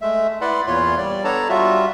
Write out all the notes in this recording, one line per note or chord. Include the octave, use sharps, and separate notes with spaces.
G#3 A3 E5
E4 B4 D5 F#5 B5 C6
E2 A#2 F4 C#5 C6
G3 D5
B3 D4 A4 C#5 A5 A#5
G3 F4 F#4 E5